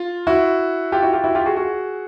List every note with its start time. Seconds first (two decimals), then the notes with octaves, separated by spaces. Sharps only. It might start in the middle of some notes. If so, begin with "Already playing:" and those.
Already playing: F4
0.27 E4 F#4
0.92 F4 G4
1.02 E4 F#4
1.13 F4 G4
1.24 E4 F#4
1.35 F4 G4
1.46 F#4 G#4
1.57 F#4 G#4